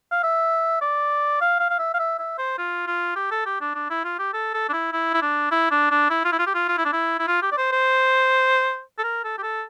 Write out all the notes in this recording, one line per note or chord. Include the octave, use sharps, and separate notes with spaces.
F5
E5
D5
F5
F5
F5
E5
F5
E5
E5
C5
F4
F4
G4
A4
G4
D4
D4
E4
F4
G4
A4
A4
D4
E4
E4
E4
D4
E4
D4
D4
E4
F4
E4
F4
G4
F4
F4
E4
D4
E4
E4
F4
G4
D5
C5
C5
A4
A#4
A4
G4
A4